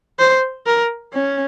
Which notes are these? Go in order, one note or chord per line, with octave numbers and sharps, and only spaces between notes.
C5
A#4
C#4